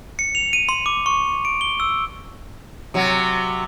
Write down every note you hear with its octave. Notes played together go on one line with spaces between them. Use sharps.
C#7
F7
D#7
C6
D6
C#6
D7
G7
E6
C3 F#3